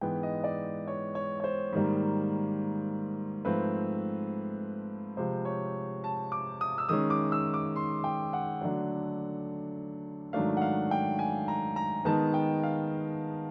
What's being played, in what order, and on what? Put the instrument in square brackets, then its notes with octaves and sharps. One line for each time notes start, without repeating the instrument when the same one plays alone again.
[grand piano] G#2 E3 G#3 B3 G5
D#5
D5
C#5
C#5
C#5
C5
G#2 D#3 G3 A#3
G#2 F3 A3 C4 B4
C3 F3 G#3 C5
C#5
A5
D6
D#6
E6
D#3 G#3 C#4 D#6
D6
E6
D6
C6
G5
F#5
D3 F#3 A3 D4
G#2 D#3 F#3 A3 D4 F5
F#5
F5
G5
G#5
A#5
A#5
D#3 G#3 B3 D#4 A5
G5
F5